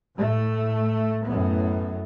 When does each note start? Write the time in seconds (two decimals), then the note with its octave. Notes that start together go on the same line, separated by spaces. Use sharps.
0.17 A2 A3
1.26 F#2 A2 B3